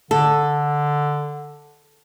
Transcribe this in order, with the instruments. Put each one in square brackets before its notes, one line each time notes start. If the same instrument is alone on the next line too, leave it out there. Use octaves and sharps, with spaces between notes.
[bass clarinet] D3 [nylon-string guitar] A4